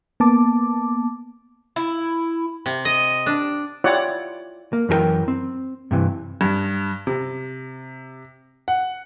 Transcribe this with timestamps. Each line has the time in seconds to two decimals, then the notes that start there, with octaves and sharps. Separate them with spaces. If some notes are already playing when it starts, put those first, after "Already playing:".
0.20 A#3 B3 A5 D6
1.76 E4
2.66 C3
2.85 D#5
3.26 D4
3.84 E4 F4 G4 C#5 D5 F#5
4.73 A#3
4.89 F#2 E3 G#4 A#4 G5
5.28 C4
5.91 G2 C3 E3
6.41 G2
7.07 C3
8.68 F#5